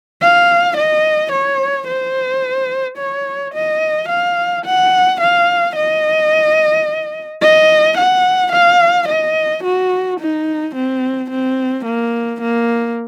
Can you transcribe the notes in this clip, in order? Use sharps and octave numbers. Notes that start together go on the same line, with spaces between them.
F5
D#5
C#5
C5
C#5
D#5
F5
F#5
F5
D#5
D#5
F#5
F5
D#5
F#4
D#4
C4
C4
A#3
A#3